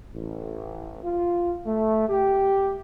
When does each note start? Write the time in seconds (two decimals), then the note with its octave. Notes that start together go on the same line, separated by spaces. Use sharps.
0.13 A1
1.03 F4
1.66 A3
2.08 G4